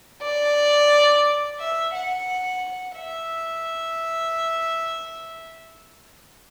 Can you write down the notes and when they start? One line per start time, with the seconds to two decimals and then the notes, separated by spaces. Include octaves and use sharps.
0.22 D5
1.60 E5
1.95 F#5
2.98 E5